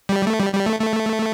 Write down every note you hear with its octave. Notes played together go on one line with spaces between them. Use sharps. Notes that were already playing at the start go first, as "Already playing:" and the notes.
G3
A3
G3
G3
A3
A3